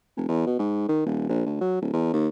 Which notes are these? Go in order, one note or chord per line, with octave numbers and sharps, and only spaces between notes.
F1
E2
B2
G#2
D#3
D#1
A#1
D2
F#3
D1
E2
D#2